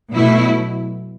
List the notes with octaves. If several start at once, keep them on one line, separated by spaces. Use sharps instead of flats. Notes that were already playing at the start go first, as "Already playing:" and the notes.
B2 F#3 A3 E4